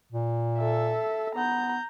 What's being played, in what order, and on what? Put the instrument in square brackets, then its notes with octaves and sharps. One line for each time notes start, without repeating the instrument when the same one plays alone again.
[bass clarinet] A#2
[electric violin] A4 E5
[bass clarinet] B3 [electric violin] A#5 G6